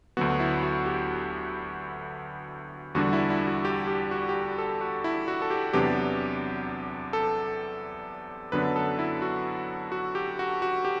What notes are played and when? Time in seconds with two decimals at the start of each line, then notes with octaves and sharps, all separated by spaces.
0.17 D2 D3 F#3 B3 F#4
0.40 E4
0.63 F#4
0.86 G4
2.95 E2 D3 G3 D4 F#4
3.13 E4
3.30 E4
3.47 F#4
3.65 G4
3.88 G4
4.11 F#4
4.29 G4
4.35 F#4
4.58 A4
4.81 F#4
5.04 E4
5.28 F#4
5.42 A4
5.51 G4
5.73 E2 C3 F#3 B3 D4 G4
7.13 A4
8.52 F#2 D3 F#3 B3 D4 B4
8.76 A4
8.99 E4
9.22 F#4
9.92 F#4
10.15 G4
10.39 F#4
10.62 F#4
10.85 G4